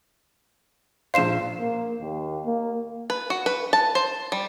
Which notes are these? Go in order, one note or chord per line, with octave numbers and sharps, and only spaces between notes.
A#1 C5 F5 C7 E7
A#3
D#2
A#3
B4
F#4
B4
A5
C5
G3